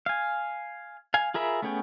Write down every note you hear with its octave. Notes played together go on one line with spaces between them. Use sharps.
F5 G#5
F5 G#5
F4 G#4 A#4 E5 B5
A3 B3 C#4 G#4 G5